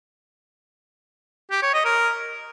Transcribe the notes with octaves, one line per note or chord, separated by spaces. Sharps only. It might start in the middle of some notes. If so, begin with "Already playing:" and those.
G4
C#5
D#5
A#4